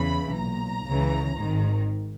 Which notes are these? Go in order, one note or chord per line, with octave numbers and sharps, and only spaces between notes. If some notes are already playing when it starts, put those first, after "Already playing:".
Already playing: E2 C#3 E3 B5
B1 A#2 A#5
C#2 C#3 E3
G#1 G#2 D#3